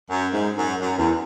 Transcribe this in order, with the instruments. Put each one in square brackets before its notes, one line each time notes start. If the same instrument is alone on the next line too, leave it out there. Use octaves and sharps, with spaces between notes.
[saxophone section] F#2
G#2
F#2
F#2
E2